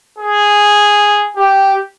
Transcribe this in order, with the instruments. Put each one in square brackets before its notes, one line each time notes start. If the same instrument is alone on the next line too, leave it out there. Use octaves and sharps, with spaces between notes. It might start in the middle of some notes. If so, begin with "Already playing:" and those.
[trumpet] G#4
G4